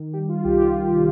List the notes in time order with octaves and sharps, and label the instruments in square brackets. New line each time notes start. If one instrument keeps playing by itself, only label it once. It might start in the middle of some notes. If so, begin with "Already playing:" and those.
Already playing: [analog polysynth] D#3
G3 G4
F4
C2 G4
F4
D#3 G4
F4